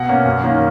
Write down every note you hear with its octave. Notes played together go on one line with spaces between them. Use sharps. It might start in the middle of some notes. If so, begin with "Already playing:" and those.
Already playing: B2 F#5
A#3 C#4
F#2
D#3 A#3 C#4